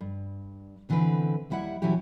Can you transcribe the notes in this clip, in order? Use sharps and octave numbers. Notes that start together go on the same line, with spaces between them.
G2
B2 D3 E3 G3 C4 B4
D#2 G3 E4 E5 F#5
B2 E3 F#3 C#4 E4 G4